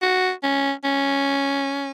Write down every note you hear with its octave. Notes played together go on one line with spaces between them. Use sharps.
F#4
C#4
C#4